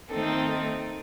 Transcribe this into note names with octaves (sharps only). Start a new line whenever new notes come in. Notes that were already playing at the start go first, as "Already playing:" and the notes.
D#3 A3 C4 D#4 A4